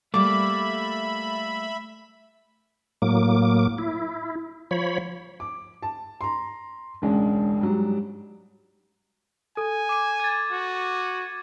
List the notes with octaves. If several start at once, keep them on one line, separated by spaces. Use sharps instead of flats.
G3 A3 A#3 E5 B5 D6
A2 F#3 A#3 D6
E4
F3 C#5 B5
D6
A5
A#5 C6
E1 C#2 G#3 C#4 D4
G#2 F#3 G3
A4 G#5
D6 D#7
G#6 A6
F#4